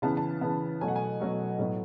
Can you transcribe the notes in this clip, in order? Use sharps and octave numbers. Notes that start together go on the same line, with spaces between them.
C#3 E3 B3 A5
A5
C#3 E3 B3
B2 F#3 A3 G#5
F#5
G#5
B2 F#3 A3
A2 F#3 B3